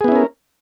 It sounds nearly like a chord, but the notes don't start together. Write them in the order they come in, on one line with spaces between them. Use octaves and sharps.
G#4 B3 E4 C#4 A#4